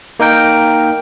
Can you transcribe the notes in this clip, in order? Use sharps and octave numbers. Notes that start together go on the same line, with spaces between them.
A#3 D#4 A#4 G5